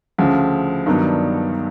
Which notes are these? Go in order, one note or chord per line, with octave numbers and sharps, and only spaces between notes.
D2 C#3 F3
G2 D#3 F#3 B3 D4